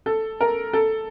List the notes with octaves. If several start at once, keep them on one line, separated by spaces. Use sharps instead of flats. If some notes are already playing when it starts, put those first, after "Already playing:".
A4
A#4
A4